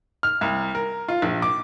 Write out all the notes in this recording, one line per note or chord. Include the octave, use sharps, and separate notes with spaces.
F6
C2
A#4
F4
A#1
D6